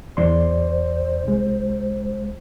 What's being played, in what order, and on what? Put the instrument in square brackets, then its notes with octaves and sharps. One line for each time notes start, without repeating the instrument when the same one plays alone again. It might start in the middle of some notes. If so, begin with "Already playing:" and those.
[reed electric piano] E2 D5 C6 [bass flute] C5
[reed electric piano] C2 G#3